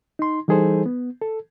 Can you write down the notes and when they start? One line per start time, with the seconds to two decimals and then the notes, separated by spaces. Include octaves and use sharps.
0.19 D#4 C6
0.48 E3 G3 D#4 G#4 A4 C5
0.86 B3
1.22 A4